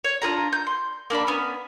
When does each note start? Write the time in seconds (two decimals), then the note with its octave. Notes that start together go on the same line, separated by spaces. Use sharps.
0.04 C#5
0.22 D4 F4 G#4 A#5
0.53 G6
0.67 C6
1.10 A#3 D4 D5 B5
1.27 B3 C#4